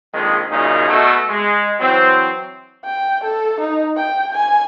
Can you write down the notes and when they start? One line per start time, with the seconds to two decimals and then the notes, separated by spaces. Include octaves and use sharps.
0.13 A#1 F2 D#3 G#3
0.51 F#2 A#2 C#3 D#4
0.88 B2 A3
1.28 G#3
1.80 E3 F#3 C4
2.85 G5
3.24 A4
3.60 D#4
3.97 G5
4.32 G#5